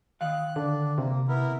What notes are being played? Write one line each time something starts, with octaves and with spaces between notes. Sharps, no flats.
D#3 F5 F#6
D3 D4
C3 A#3
B3 E4 A#4